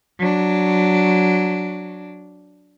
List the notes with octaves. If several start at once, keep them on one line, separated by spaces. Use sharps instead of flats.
F#3 D4